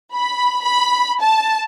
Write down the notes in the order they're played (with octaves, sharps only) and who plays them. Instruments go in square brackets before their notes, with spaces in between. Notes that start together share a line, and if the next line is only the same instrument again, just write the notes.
[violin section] B5
B5
A5